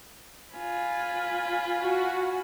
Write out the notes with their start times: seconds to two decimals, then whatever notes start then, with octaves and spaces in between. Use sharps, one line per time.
0.54 F4 G#5 B5
1.81 F#4